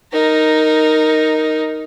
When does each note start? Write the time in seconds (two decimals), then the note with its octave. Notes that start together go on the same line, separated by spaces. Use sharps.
0.13 D#4 A#4